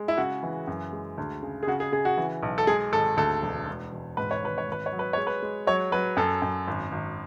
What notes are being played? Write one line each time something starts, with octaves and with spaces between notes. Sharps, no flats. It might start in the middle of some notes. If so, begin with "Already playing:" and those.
Already playing: G#3
E4
C#3 F#4
E3
F#2
G#3
D2
C#3
G#4
C#3 F#4
G#4
C#3 G#4
F#4
E3
B1
A4
G#3 G#4
G#1 A4
D2 A4
E1
E1
E1
G#2 B4
C#5
G#1 B4
C#5
G#1 B4
C#5
F#3
B4
G#3 C#5
B4
G#3
F#3 C#5
F#3 B4
F#2 A4
F#2
G#1
G#1